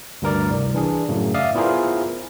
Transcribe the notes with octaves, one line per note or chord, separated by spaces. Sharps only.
D2 G2 A#4 D5
C2
E3 D4 G#4
F#2 A2 C#3
D5 E5 F5 D#6
B3 E4 F4 G#4 A#4 C5